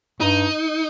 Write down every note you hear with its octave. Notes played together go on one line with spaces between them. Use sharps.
G2 D#4